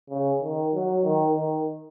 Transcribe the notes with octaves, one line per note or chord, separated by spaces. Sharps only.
C#3
D#3
F#3
D#3
D#3